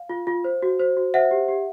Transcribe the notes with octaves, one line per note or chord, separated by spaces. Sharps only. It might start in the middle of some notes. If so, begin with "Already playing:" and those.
Already playing: F5
F4
F4
C5
F#4
C5
F#4
C5 E5 F#5
G4
G4